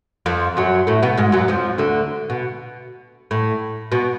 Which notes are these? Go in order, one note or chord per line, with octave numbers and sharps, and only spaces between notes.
F2 F3
F#2 F#3
A2 A3
B2 B3
G#2 G#3
F#2 F#3
F2 F3
D2 D3
B2
A2
B2